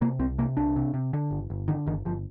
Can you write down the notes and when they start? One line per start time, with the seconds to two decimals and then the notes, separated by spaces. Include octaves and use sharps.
0.01 C3 A#3
0.19 C2 C4
0.38 C3 A#3
0.57 C2 D4
0.76 C3
0.94 C3
1.13 D3
1.31 G1
1.50 G1
1.68 D3 D#3
1.86 G1 D#3
2.05 G1 F3